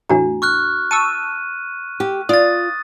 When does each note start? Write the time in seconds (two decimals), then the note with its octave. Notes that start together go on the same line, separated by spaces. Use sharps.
0.09 E2 A2 D4 F#4 A#5
0.42 C#6 F6 F#6
0.91 A5 C#6 E6 D#7
2.00 G4
2.29 F4 D5 D#6 A6